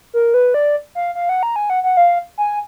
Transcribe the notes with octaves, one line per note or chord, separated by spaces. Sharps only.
A#4
B4
D5
F5
F5
F#5
A#5
G#5
F#5
F#5
F5
G#5